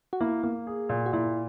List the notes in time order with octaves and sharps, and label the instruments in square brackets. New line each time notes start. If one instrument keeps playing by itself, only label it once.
[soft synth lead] F#4
[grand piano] A#3 [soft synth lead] E4
[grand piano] A#3
G#4
A#2
[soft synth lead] F#4
[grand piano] A#2 [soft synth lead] E4